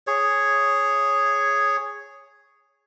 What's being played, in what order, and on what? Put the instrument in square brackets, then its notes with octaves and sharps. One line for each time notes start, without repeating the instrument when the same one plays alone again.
[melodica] G#4 C#5